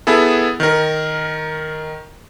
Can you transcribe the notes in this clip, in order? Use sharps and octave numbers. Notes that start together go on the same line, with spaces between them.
B3 E4 G#4 A4
D#3 A#4